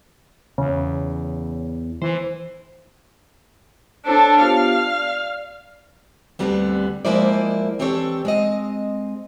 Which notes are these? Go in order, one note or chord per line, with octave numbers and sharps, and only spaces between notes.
E2 C#3
E3 C5
D4 A4 C5 C#5 A5
B3 F4 G4 F5
D5
D2 G2 D3 G3 B3 C4
F3 G#3 A#3 E4 C5 D5
E3 C4 D4 G4 A4 C#5
G#3 C4 D#5